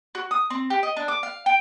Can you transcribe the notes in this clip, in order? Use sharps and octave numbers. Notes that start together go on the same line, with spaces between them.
F#4
D#6
C4
G4
D#5
D4
D6
F5
G5